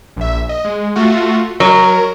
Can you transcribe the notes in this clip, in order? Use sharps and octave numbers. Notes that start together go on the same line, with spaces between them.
A#1 E5
D#5
G#3
A3 F4 F#4
F#3 A#4